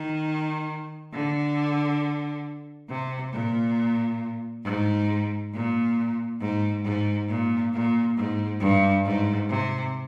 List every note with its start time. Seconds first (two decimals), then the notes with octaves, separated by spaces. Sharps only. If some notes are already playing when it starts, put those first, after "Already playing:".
Already playing: D#3
1.12 D3
2.89 C3
3.33 A#2
4.64 G#2
5.53 A#2
6.40 G#2
6.84 G#2
7.28 A#2
7.73 A#2
8.17 G#2
8.60 G2
9.05 G#2
9.49 C3